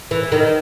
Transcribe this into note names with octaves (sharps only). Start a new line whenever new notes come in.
E3
D#3